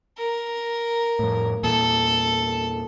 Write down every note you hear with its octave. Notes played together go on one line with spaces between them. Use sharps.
A#4
F2 A2
E2 A#2 A4